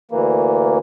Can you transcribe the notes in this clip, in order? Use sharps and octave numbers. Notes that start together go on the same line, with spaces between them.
D2 E3 A#3